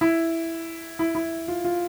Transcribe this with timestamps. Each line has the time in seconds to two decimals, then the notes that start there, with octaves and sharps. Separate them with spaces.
0.01 E4
0.99 E4
1.15 E4
1.48 F4
1.64 F4